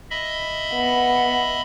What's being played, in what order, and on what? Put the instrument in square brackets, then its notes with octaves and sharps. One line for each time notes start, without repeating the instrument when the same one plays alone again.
[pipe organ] D#5 E5 B5
[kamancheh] B3